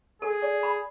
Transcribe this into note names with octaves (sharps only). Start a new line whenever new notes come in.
G#4 A4
D5
B5